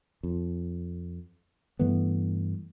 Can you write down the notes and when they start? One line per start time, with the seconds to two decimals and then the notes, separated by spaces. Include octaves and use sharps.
0.23 F2
1.79 G2 E3 A3 B3